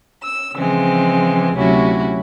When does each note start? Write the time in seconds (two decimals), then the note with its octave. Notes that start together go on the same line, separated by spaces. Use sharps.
0.22 E6
0.54 C#3 E3 F3 G#3 C4
1.54 D2 C3 F#3 C#4 E4 F#4